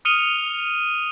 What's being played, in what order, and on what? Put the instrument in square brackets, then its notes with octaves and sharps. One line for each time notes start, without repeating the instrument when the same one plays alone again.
[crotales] D#6 F6 C#7 D#7 F7 G7